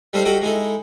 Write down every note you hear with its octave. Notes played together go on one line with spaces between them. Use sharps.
G3 D4 D#4 A4 C5 F5
F#4 G4 A4 D#5 F#5 D6
G#3 D#4 E4 A4